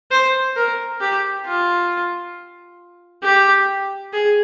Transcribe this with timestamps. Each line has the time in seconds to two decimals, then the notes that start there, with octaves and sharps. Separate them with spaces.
0.11 C5
0.56 A#4
1.01 G4
1.46 F4
3.23 G4
4.13 G#4